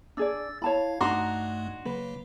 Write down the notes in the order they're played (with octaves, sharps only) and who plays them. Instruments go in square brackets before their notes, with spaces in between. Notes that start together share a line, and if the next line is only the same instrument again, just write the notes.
[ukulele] D4 G#4 D5 [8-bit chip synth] E6 A6
[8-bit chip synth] E4 F5 [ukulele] C#5 A5 B5
[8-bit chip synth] G2 A3 [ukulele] D4 D#4 [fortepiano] F#4 A#5 C6
[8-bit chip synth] C#3 F#3 A#3 [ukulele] B4